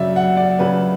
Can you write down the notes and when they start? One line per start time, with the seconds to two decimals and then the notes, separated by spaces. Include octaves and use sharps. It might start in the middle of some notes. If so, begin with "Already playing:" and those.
Already playing: F#2 C#3 F#3 D5 E5
0.16 F#5
0.37 D5
0.59 F#2 C#3 F#3 B4